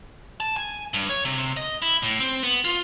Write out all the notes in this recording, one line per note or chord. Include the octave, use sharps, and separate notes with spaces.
A5
G#5
G2
C#5
C3
D#5
E4
A2
C4
B3
F4